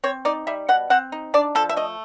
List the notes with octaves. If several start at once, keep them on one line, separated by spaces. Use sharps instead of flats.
C4 C#5
D#4 D5
G3 E5
B2 F#5
C4 F#5
D#4
D4 D5
F3 A4
E5
A3 D#5